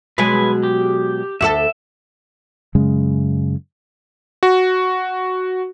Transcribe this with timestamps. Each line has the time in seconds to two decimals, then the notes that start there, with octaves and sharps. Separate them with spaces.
0.18 B2 F#3 G#3 B4 G#5
0.63 G4
1.41 D2 F#4 A4 E5
2.75 F#2 C#3 G#3
4.43 F#4